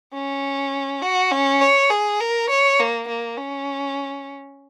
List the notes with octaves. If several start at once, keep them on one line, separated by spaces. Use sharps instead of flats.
C#4
F#4
C#4
C#5
G#4
A#4
C#5
A#3
A#3
C#4